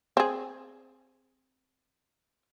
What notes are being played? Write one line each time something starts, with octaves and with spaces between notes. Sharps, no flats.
C4 G#4